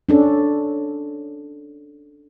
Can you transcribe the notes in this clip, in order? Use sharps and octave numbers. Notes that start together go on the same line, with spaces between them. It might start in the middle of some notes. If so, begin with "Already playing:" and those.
C#4 D4 A4